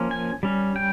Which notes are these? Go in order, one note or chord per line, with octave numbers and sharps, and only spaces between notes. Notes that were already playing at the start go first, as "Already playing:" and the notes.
Already playing: F3 A#3 C#4
G#5
G3 C#4
G5